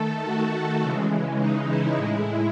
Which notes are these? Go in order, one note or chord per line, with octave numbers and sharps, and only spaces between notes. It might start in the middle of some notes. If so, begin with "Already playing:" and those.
Already playing: D#3 A3 A4
F#4
C#3 E3 G#3
D#4
E4
A2 G#3